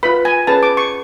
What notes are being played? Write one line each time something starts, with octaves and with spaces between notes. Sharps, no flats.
F4 B4 B5
G#5
C#4 G#4 B4 A5
D6
C#6